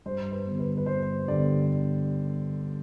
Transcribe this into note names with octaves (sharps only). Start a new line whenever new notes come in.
G2 C5
B4
D3 G3 B3
B4
B4
G2 C5
D3 G3 B3 D5